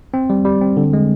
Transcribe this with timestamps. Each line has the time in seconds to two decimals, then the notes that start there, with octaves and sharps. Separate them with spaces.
0.14 C4
0.30 G3
0.45 G3
0.61 C4
0.77 D3
0.93 G#3